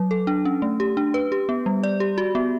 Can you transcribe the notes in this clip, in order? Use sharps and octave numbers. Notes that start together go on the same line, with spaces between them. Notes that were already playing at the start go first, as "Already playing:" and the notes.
Already playing: F#3
A4
D4
C#4
A3
G4
D4
B4
G4
B3
G3
D5
G4
F#4
B3